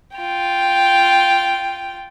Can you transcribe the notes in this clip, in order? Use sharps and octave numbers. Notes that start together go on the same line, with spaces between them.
F4 G5